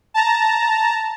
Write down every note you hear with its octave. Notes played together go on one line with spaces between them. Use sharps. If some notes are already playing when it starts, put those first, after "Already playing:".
A5 A#5